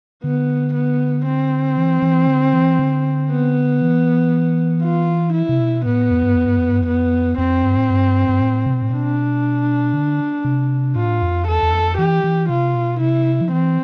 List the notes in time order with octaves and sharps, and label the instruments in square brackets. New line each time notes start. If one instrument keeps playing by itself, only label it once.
[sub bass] D3 [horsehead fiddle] B3
[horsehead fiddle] B3
C4
[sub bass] E3
E3
D3
E3
D3
[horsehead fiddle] B3
[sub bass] E3
[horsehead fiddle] F4
E4
[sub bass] C3
B2
[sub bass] A2 [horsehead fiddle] B3
[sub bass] F2
G2
F2
G2
F2
G2
F2
[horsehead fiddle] B3
[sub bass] F2 [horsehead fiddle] C4
[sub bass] G2
A2
G2
G2
A2
C3
B2
A2
[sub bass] B2 [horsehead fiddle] D4
[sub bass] D3
C3
[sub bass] A2 [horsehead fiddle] F4
[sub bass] F2
[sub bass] E2 [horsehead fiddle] A4
[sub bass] E2
F2
[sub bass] E3 [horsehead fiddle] G4
[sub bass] E3
[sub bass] C3 [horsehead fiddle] F4
[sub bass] B2
[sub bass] C3 [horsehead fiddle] E4
[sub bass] F3
[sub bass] E3 [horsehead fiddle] C4